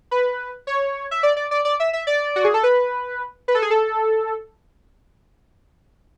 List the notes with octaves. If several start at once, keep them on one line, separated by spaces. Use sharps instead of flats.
B4
C#5
E5
D5
D5
D5
D5
E5
E5
D5
F#4
G#4
A4
B4
B4
A4
G#4
A4